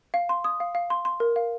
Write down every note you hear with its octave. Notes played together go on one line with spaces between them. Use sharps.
F5
C6
D#6
F5
F5
C6
C6
A#4
F5